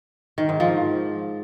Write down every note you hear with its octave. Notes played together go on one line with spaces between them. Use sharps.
D#3
G#2
F3